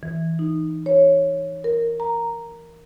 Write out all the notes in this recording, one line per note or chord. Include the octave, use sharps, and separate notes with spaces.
E3
D#4
C#5
A#4
A#5